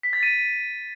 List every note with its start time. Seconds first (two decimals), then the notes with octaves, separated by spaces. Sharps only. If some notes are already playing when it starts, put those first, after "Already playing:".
0.03 B6
0.13 A6
0.23 D#7